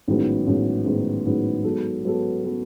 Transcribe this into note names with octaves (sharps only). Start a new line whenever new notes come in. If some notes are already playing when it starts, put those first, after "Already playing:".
A1 G#2 D#3 F#3 B3
A1 G#2 D#3 F#3 B3
A1 G#2 D#3 F#3 B3
A1 G#2 D#3 F#3 B3
G#2 F#3 B3 F#4 A4
G#2 F#3 B3 F#4 A4
F#3 B3 F#4 A4